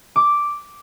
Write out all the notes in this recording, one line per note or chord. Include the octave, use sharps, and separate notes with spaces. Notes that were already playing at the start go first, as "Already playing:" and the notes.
D6